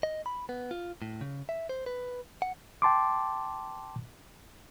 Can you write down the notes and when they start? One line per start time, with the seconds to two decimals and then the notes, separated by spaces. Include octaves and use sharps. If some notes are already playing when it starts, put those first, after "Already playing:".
0.03 D#5
0.26 B5
0.49 B3
0.71 F4
1.02 A2
1.21 C#3
1.49 E5
1.69 C5
1.86 B4
2.42 F#5
2.82 G5 A5 C6 D6